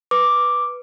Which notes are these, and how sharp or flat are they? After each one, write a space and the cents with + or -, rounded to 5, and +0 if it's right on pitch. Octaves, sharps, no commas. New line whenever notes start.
B4 +0 D6 +0